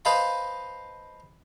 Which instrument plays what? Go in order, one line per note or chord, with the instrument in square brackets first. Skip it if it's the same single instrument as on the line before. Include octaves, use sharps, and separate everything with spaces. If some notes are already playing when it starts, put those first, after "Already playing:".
[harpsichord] B4 C5 D#5 F5 A5 B5